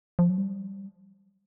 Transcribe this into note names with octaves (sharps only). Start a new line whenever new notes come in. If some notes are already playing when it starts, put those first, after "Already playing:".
F3
F#3
G3